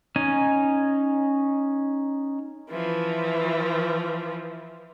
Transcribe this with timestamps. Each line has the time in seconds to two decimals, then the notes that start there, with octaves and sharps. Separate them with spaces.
0.16 C#4 D#4 G#5
2.70 E3 F3